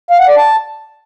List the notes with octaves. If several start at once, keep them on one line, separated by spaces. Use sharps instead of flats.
F5
F#5
D5
A5